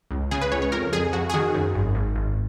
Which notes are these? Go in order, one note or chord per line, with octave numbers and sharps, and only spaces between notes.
C#2
C#3 G#4
B4
C#2 C#5
C#5
F2 A#4
F2 G#4
F2 F#4
G#4
D#3 F#4
F#2
G#1
G#1
G#1